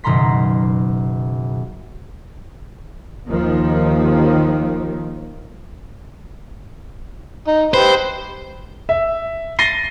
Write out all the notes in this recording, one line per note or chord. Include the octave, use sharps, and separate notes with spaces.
F#1 B2 D#3 A#5 C6 B6
D#2 D#3 F3
D#4
G4 B4 C5
E5
A6 A#6 C7 D#7 G7